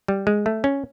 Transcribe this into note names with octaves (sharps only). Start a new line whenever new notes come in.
G3
G#3
A3
C#4